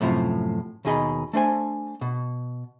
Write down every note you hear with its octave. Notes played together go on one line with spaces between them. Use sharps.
F#2 A2 C3 F3
D#2 B2 D#4 G#4 D#5 B5
A3 D4 C5 G#5
B2